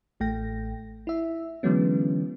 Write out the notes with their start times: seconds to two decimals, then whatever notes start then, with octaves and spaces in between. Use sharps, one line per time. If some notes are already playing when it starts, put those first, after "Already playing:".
0.20 A1 A3 G5 A#6
1.07 E4 E5
1.63 D3 E3 F#3 G#3 B3 C#4